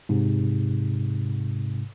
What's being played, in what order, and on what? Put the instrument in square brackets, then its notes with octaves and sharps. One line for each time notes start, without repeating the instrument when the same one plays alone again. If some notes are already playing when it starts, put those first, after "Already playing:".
[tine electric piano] G#2 C3